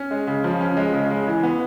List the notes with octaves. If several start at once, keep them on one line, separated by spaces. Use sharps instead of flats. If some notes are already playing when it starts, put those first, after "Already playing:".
Already playing: C#4
G#3
C#3
F3
C#4
G#3
C#3
G#3
E3
B3